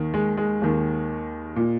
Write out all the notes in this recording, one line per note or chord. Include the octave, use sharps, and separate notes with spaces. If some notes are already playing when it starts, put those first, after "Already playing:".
Already playing: D#2 D#3
G#3
G#3
D#2 D#3
A#2